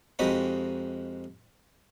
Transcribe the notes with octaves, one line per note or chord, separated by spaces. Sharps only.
F2 G#3 D#4 F#4 G4 B5